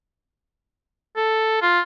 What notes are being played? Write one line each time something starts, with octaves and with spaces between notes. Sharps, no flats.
A4
F4